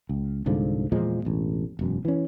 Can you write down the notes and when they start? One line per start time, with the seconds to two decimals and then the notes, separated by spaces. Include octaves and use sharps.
0.09 C#2
0.46 C2 G#2 D3 F3
0.92 E2 A#2 F3 G#3
1.25 E1 A1
1.79 E1 F#2
2.05 E3 C#4